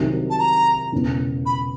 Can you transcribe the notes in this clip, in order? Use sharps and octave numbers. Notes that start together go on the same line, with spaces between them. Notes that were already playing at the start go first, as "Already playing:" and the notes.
Already playing: C2 C3 D#3 F#3
A5
A#5
E1 E2 C#3 E3
B5